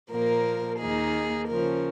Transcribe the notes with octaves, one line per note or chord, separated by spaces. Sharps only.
A#2 F3 A#3 A#4
D#2 D#3 A#3 D#4 G#4
C#3 F3 C#4 A#4